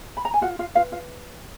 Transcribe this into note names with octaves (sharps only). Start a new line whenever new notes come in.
B5
A#5
G#5
F4 F#4 F#5
F4 F5
F4 B4 F5
F4 F5